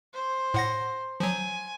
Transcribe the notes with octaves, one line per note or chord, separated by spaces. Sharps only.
C5
A2 F#5 A#6
F3 F#3 G#5